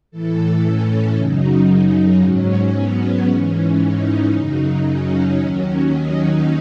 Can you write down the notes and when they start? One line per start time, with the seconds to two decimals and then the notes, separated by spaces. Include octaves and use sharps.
0.11 A2 E3 A4
0.64 C#4
1.16 F#2 C#3 F#3 D#4
2.21 G#2 F#3 C#4
2.74 B3
3.27 G#2 E3 C#4
3.80 D#4
4.31 F#2 C#3 F#3 D#4
4.85 C#4
5.37 D#2 D#3 F#3 C#4
5.90 D#4